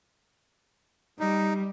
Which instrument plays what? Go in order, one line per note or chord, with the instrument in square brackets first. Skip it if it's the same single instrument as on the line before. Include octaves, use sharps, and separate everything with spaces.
[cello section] G3 [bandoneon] D#4